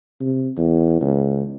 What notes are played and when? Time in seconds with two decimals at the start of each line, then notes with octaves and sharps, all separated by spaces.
0.20 C3
0.57 E2
1.00 C#2